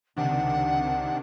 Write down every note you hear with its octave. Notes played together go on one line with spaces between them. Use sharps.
C#2 C3 D#3 D4 F#5